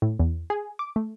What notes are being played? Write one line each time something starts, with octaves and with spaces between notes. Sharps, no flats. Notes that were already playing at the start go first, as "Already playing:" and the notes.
A2
E2
G#4
D6
A3